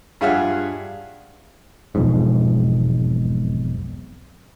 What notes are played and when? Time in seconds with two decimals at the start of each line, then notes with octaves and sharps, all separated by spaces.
0.21 G2 F4 G#4 E5 F#5 F6
1.95 E1 B1 F2 G#2